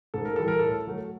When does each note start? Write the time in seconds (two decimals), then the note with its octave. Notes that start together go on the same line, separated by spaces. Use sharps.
0.14 G#2 A4
0.25 A#4
0.36 E3 G3 A4
0.48 A#4
0.59 A2 A4
0.87 F#3 A3